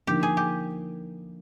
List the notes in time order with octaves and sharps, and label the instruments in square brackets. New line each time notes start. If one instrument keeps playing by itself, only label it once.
[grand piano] D3 F3 A#3 D#4 [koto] G4
[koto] G#4
G4